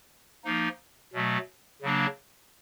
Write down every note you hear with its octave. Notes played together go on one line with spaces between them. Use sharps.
F3 A#3 D#4
B2 F#3 A3
C#3 F#3 A#3 D4